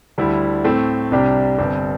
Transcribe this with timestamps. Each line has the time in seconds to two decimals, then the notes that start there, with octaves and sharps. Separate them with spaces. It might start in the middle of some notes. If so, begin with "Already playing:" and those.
0.18 D2 D3 G3 E4
0.64 A2 A3 C4 A4
1.12 C2 C3 G3 D4 G4
1.58 G1 G2 G3 C4